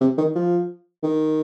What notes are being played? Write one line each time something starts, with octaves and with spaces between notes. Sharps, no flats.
C3
D#3
F3
D#3